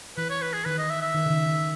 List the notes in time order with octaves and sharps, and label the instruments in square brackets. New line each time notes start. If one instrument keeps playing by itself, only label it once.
[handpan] E3 [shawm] B4
[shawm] C#5
B4
G#4
[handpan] D#3 [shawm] B4
[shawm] D#5
E5
E5
[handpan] D#3
C#3
D#3
D#3